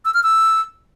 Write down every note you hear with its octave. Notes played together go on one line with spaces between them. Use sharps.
E6
F6
E6